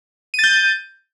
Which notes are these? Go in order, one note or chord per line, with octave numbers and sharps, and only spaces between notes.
G6 A6 D#7